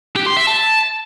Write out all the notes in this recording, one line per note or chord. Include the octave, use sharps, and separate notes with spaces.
G4
C6
E5
A5